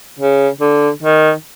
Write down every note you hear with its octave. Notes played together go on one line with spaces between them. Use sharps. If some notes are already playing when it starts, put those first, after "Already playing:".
C#3
D3
D#3